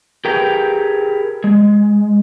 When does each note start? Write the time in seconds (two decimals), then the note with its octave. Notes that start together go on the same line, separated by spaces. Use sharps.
0.25 G4 G#4 A#4 B4 G5
1.44 G#3